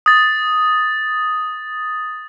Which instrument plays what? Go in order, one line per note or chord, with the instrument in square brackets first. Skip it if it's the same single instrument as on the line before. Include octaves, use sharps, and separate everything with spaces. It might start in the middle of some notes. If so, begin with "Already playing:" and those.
[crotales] D#6 A6